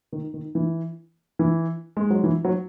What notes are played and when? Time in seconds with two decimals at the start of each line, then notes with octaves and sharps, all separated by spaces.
0.12 D#3
0.34 D#3
0.55 E3
1.39 E3
1.97 G#3
2.10 F#3
2.24 E3
2.45 F#3